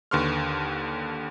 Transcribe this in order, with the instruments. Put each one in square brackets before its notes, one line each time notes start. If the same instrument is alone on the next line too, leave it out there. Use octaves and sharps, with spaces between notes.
[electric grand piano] D#2 D3 B4 C6 C#6 F6